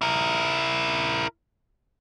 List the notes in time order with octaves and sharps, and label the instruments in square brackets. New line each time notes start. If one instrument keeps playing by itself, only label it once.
[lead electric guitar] E4 A#4